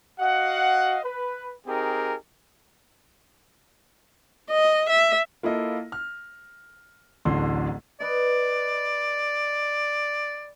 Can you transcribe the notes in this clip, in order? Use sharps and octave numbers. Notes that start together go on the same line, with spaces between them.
F#4 D#5 F5 F#5
B4
C4 D#4 G4 G#4 A#4
D#5
E5
A#3 E4 F4 A4 D#5
F6
D1 A1 D3 C6
B4 D5 D#5